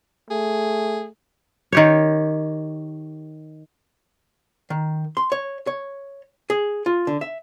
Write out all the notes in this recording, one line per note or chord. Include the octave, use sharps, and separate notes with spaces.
A3 G#4
D#3 G4 C#5
D#3
C6
C#5
C#5
G#4
F4
D3
E5